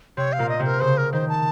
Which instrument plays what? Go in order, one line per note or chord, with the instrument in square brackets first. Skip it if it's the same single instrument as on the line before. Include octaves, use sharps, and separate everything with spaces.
[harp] C3 C4 [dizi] C#5
[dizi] F5
[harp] A#2 A#3
[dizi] D#5
[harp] C3 C4
[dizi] A#4
[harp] C#3 [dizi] C5
[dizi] A#4
[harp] D#3 [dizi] C5
[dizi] A5